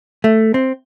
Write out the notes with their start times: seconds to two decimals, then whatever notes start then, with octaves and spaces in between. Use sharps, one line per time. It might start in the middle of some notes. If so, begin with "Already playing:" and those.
0.24 A3
0.54 C4